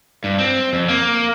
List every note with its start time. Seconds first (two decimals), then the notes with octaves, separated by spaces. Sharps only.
0.24 G2
0.39 C4
0.73 F2
0.88 A#3